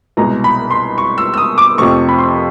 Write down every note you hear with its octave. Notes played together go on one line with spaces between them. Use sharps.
C2 B2 G#3 A#5
B5
C6
C#6
E6
E6
D#6
D6
F2 C3 F3 A3 C#6
B5
C6